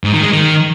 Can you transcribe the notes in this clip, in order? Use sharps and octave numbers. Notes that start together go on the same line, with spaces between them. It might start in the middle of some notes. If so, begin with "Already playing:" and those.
G#2
D#3
G#3
D#3